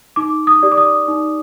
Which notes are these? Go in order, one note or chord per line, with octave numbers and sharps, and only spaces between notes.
D#4 D6
D#6
G4 D5
D6
D#6
D#4